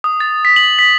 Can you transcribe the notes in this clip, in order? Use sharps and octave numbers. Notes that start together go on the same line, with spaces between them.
D#6
A6
B6
F#7
B6